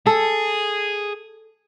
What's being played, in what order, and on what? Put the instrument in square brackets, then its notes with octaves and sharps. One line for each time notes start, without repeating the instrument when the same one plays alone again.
[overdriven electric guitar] G#4 [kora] A4